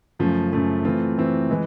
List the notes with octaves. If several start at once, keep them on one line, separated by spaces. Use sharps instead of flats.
F#2 C#3 F3 A3
F#2 C#3 F3 A3
E3 A3 C4 F4
E3 A3 C4 F4
E3 G#3